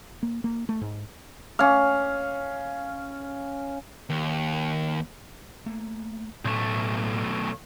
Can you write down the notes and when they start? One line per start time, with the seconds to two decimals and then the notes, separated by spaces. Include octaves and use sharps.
0.23 A#3
0.44 A#3
0.69 A3
0.81 G#2
1.59 C#4 F5
4.10 D#2
5.66 A3 A#3
6.45 B1 A2 A3